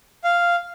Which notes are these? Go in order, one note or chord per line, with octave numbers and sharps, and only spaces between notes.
F5